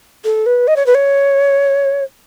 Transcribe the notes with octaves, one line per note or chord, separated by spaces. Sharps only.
A4
B4
D#5
C#5
B4
C#5